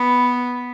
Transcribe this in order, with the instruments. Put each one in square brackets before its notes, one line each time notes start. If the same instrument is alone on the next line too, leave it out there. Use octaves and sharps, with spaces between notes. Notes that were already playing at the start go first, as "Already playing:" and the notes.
Already playing: [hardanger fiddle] B3